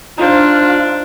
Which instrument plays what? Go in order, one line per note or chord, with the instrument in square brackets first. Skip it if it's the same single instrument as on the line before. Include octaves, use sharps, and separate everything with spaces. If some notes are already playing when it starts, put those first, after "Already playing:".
[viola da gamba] D4 [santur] D#4 C5 [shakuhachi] F4